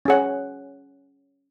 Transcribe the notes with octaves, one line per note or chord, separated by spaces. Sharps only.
C#4 G#4 C#5 F#5